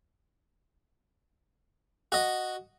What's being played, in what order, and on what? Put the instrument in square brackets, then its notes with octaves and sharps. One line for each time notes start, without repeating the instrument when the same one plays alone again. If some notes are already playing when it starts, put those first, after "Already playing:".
[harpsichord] F#4 D#5